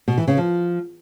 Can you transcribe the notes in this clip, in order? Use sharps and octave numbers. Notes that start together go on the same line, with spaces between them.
B2
E3
C#3
F3